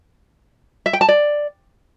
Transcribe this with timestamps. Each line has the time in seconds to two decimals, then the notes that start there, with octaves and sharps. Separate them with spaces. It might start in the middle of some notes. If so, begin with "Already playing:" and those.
0.86 E5
0.93 G5
1.01 A5
1.08 D5